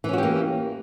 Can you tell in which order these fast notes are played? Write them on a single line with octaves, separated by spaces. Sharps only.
E3 C#4 F#4 G4 A#3